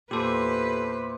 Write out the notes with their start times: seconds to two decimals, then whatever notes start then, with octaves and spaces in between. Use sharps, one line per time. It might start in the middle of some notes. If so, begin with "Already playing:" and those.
0.11 E2 A#2 G4 A4 B4 C5